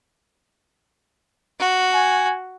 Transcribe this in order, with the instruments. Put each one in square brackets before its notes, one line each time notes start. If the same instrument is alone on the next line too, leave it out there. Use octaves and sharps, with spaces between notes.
[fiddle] F#4
[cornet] G#5